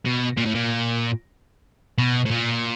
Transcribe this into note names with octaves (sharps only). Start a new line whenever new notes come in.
B2
A#2
A2
A#2
B2
A2
A#2